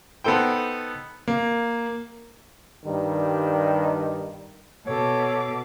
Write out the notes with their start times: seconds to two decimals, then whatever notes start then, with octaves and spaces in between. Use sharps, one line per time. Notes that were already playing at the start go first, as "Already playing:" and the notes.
0.24 B3 D#4 A4 C5 G5
1.28 A#3
2.84 G2 D#3 G3
4.87 B2 A4 C#5 D6